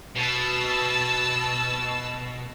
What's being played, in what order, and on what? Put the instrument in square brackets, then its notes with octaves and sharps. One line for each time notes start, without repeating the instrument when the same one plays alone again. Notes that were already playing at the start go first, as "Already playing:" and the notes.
[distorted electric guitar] B2 [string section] A5 E6